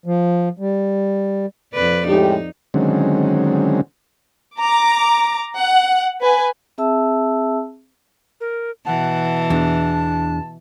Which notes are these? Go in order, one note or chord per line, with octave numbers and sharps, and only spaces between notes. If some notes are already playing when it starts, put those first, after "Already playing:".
F3
G3
F2 B4 D5
A2 G#3 D#4 G4
D3 D#3 F#3 G#3 C4 C#4
A#5 D6
F#5
B4 G#5
C4 G#4 E5 A5 E6
A#4
B2 E3 F#5 A5
E2 D4